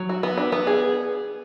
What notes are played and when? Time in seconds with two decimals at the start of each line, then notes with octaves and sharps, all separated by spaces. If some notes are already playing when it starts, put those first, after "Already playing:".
Already playing: F#3
0.09 F#4
0.23 B3
0.38 D4
0.52 B3
0.67 G#4